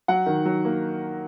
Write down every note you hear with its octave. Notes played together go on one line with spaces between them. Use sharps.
F#3 F#5
D#3
F#3
A#3